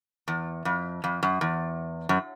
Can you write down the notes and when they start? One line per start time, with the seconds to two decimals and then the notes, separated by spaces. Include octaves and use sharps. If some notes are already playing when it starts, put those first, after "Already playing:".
0.28 E2
0.65 F2
1.04 F2
1.23 F#2
1.41 E2
2.09 F#2